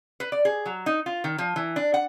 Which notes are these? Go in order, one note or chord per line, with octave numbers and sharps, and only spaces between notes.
B4
D5
G#4
F#3
D#4
F4
D#3
F3
E3
D4
F#5